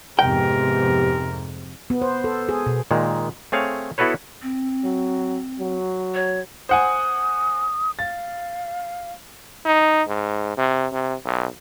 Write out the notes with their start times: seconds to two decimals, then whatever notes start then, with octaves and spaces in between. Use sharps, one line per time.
0.19 F2 G#2 C3 B3 G4 A#4 G5
1.90 B3
2.02 C5
2.24 A4
2.49 G#4
2.66 B2
2.91 A#2 D#3 G#3
3.52 A3 C4 G#4 C#5 F5
3.98 B3 E4 F#4 A4 B4 C#5
4.42 C4
4.84 F#3
5.59 F#3
6.15 C#5
6.69 C5 F#5 G#5 D#6
7.99 F5 A6
9.66 D#4
10.08 G#2
10.57 C3
10.92 C3
11.25 B1